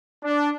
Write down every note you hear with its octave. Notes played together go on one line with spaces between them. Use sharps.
D4